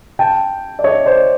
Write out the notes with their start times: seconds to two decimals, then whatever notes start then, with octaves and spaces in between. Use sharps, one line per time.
0.19 G5 A5
0.79 D5
0.84 C#5 D#5
1.06 C5 D5